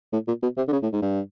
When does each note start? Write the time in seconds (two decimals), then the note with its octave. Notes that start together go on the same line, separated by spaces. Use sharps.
0.13 A2
0.28 A#2
0.43 B2
0.57 C3
0.68 D3
0.72 C#3
0.83 A2
0.93 G#2
1.02 G2